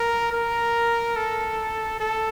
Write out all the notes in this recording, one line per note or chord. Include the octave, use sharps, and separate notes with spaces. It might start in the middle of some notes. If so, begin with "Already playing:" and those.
Already playing: A#4
A#4
A4
A4